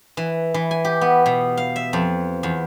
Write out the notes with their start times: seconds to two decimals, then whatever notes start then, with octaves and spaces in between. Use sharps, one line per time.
0.17 E3
0.54 E3
0.71 G#5
0.85 G4
1.01 B3
1.26 B2
1.57 F5
1.76 E5
1.93 F2
2.43 E2